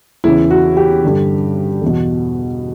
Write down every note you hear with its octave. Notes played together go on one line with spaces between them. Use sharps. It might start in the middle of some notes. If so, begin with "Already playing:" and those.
E2 C#3 E3 E4
F#4
G4
G2 D3
E2 B2